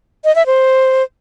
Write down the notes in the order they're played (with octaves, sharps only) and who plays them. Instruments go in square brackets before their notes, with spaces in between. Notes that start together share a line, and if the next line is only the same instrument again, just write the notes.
[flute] D#5
E5
C5